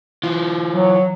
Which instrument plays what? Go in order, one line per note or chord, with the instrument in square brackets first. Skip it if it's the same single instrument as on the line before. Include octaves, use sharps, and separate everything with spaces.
[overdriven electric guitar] E3 F4
[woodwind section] F#3